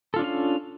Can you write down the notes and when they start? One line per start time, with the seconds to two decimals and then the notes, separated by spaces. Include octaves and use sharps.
0.14 A4
0.16 F4
0.19 D4
0.22 C#4
0.24 F5